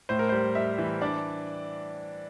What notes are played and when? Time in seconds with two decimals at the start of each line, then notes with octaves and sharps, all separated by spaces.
0.09 A2 C5
0.19 A#4
0.29 G3 C5
0.55 G3 E5
0.78 E3
1.01 D4 D5